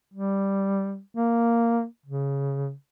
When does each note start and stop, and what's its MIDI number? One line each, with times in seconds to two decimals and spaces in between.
0.14 1.00 55
1.16 1.84 58
2.06 2.72 49